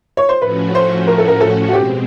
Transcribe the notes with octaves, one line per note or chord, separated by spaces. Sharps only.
C#5
C5
A2 F3 A3 C#4 F#4 B4
C5
A#4
A4
A#4
A4
F#4
B2 G#3 C4 G4